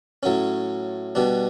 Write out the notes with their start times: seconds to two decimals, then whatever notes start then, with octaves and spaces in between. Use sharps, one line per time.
0.23 A2 F#3 C#4
1.15 B2 G3 D4